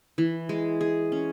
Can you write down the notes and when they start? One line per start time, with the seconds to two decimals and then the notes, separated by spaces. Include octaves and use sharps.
0.18 E3
0.49 G#3
0.81 G#4
1.12 C#4